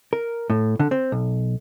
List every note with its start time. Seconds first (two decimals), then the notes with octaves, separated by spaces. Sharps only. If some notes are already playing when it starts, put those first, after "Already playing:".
0.13 A#4
0.50 A2
0.79 D3
0.91 C4
1.12 B1